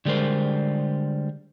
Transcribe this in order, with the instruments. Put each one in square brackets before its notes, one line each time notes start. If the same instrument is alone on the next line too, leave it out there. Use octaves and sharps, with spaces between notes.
[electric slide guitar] D3 G3 G#3 A#4 C5